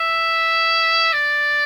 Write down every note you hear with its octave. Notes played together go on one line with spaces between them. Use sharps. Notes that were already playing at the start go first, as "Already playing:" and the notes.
Already playing: E5
D5